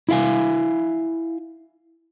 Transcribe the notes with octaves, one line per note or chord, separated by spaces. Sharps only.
E4 E5 F5 G#5